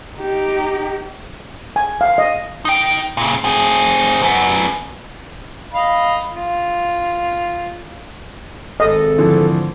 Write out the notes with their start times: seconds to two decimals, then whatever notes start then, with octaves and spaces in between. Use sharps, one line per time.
0.18 D#4 G4
1.76 G#5
2.01 F5
2.18 D#5
2.65 D#4 G5
3.17 A#2 C#3
3.44 C4 G#4
4.23 F#2 B3
5.73 D#5 F5 B5
6.34 F4
8.80 G#1 A4 D#5
9.18 D3 E3 F3